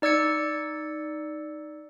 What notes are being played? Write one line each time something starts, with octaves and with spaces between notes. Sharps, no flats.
D#4 D5 E6 G#6 C#7